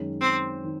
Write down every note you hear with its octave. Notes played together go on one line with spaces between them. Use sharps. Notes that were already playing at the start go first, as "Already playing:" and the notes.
Already playing: F#2 D#3 G#3 C#4
C4
D#3